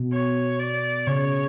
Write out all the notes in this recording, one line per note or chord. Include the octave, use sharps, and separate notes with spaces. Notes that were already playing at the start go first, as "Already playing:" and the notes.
Already playing: B2
C#5
D5
C#3 C#5